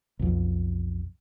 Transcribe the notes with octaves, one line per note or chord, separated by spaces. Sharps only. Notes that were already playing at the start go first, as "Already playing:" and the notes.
B1 F2